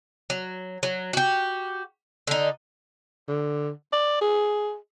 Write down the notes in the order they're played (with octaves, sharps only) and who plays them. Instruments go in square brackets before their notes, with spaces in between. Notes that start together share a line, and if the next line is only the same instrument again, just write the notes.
[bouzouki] F#3
F#3
F#4 G4
D3 D#4
[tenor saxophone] D3
D5
G#4